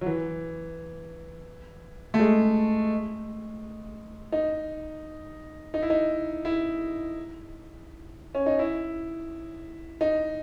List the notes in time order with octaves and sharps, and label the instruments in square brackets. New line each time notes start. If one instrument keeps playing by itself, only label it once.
[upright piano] F#3
E3
A3
G#3
D#4
D#4
E4
D#4
E4
C#4
D#4
E4
D#4